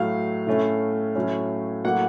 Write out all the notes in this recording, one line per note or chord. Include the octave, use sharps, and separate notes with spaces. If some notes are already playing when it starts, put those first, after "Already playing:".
Already playing: A2 F#3 A3 F5
A2 A3 C#4
A2 F#3 A3 C#4
A2 F#3 A#3 F#5